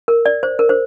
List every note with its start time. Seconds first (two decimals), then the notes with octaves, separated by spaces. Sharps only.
0.08 A#4
0.26 D5
0.43 C5
0.59 A#4
0.69 C5